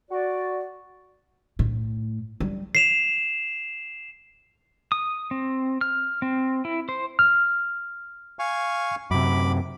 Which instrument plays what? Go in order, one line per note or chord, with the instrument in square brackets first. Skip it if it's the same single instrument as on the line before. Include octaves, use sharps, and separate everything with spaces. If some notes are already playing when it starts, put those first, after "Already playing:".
[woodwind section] F#4 D5
[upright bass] A2
G3
[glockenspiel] C7 E7 F7
[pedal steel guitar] D#6
C4
F6
C4
E4
C5
[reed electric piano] F6
[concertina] F5 G#5 C#6
[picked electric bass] F#2 C3 [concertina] B5 D6